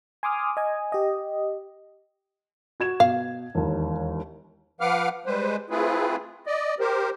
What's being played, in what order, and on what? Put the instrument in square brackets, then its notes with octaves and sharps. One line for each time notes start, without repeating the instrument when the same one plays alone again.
[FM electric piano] G#5 C6 D6 D#6 F6
D#5 G#5
G4 D#5
[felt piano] F#4 G#6 E7
[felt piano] B2 [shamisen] F5
[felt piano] E1 D#2
[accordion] F3 B4 F5 F#5 D6 F6
G3 G#3 B4 C5
A3 C4 E4 F4 G#4 B4
D5 D#5
G4 A#4 C5